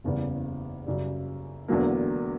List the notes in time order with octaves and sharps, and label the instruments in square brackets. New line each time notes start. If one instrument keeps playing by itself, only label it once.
[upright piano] F#1 E2 C#3 G3
F#2 C#3 G3
E1 E2 D3 F#3 A#3